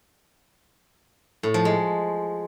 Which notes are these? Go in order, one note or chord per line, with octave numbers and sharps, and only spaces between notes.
A2
F3
G#3